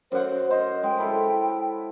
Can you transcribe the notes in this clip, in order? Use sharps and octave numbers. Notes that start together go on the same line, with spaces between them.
F#2 C5 F#5
C5 D#5
G#3 G5
E4 A4 B4